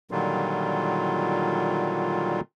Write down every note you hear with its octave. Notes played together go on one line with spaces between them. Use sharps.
A#2 D3 D#3 F#3 G3 F4